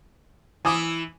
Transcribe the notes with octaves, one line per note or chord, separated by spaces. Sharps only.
E3 E4 G#5 D6 D#6